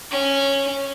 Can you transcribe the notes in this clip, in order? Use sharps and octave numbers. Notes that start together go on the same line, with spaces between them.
C#4